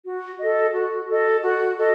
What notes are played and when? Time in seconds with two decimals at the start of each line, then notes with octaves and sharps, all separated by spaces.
0.04 F#4
0.39 A4 D#5
0.73 F#4
1.09 A4 D#5
1.43 F#4
1.79 A4 D#5